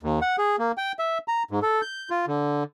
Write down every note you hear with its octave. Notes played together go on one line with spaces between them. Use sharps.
D#2
F#5
G#4
A#3
G5
E5
A#5
G#2
A4
G6
F4
D3